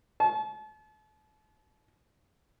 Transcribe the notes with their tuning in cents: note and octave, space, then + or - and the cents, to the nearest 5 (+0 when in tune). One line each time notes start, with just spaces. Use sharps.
A5 -40